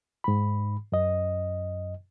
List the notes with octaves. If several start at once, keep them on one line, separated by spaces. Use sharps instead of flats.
G#2 B5
F#2 D#5